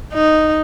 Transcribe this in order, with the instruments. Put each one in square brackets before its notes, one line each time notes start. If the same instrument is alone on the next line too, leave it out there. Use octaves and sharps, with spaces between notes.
[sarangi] D#4